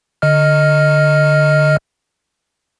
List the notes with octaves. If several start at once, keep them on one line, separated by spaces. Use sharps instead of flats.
D3 D#5 F6